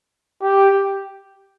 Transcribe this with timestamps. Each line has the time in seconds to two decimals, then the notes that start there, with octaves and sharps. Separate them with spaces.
0.42 G4